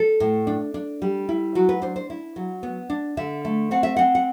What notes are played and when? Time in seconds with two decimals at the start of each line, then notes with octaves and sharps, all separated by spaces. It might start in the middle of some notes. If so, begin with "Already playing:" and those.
Already playing: A4
0.20 A2
0.47 D4
0.74 D4
1.02 G3
1.29 E4
1.55 F#3 F#4
1.69 B4
1.82 D4 C5
1.96 C5
2.10 E4
2.36 F#3
2.63 B3
2.90 D4
3.17 D3 E5
3.45 A3
3.71 C4 F#5
3.83 E5
3.96 C4 F#5
4.15 F#5